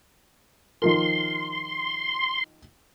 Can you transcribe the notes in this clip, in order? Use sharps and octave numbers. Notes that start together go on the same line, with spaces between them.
D#3 F3 A#4 C6